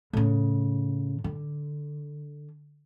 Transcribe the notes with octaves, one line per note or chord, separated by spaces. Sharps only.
A2 C#3
D3